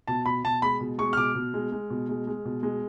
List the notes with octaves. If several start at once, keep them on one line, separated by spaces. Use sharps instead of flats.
B2 A5
B2 B5
B2 A5
G#3 B5
B2
G#3 C#6
F6
B2 D6
B2
G#3
G#3
B2
G#3
G#3
B2
G#3